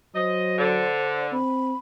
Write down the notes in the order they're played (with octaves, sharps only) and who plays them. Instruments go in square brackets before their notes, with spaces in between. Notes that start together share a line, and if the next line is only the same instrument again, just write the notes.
[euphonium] F#3 [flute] C5 [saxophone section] D#5
[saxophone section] D3
[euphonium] C4 [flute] B5